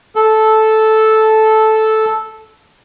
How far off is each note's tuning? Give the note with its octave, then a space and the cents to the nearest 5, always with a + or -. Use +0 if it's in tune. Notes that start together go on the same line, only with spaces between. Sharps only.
A4 -10